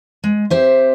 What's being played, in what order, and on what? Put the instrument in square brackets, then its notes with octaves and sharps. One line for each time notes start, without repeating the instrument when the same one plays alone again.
[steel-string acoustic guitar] G#3
C4 G4 C5 E5